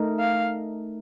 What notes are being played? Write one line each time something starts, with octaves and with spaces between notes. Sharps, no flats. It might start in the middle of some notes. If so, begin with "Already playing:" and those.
Already playing: A3 D#4 A#4
F5